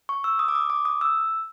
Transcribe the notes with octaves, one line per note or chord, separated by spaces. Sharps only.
C#6
E6
D#6
D6
D#6
D6
D#6
E6